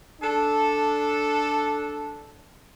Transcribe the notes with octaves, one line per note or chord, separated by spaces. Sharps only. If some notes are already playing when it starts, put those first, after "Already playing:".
D4 A4